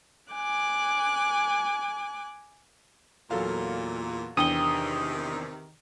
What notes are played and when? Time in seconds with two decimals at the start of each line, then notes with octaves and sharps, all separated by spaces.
0.32 G#5 D6 F#6
3.31 E2 A#2 F#3 A4 F5
4.37 E2 C3 D#3 D4 G5 D#6 G7